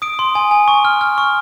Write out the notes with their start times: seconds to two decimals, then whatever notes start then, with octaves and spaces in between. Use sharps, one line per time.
0.02 D#6 D7
0.19 C6
0.35 G#5
0.51 G#5
0.68 C#6
0.85 F6
1.01 F6
1.18 C#6